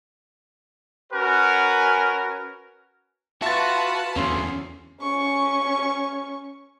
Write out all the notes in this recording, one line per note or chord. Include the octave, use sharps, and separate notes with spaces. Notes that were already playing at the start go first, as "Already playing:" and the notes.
C#4 F#4 A#4 B4 G#5
F4 F#4 B4 E5 F#5 A5 A6
E2 D3 A3 C#4 C6
C#4 C#6